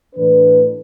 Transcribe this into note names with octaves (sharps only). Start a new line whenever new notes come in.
A2 E3 A3 D4 B4